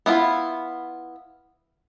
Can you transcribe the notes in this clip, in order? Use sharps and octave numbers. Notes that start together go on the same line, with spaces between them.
B3 E4 F4